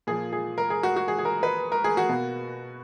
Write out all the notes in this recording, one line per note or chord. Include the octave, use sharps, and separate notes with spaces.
A#2 F3 A#3 G#4
G#4
A#4
G#4
F#4
F#4
G#4
G#4
A#4
B4
A#4
G#4
F#4
B2 A#3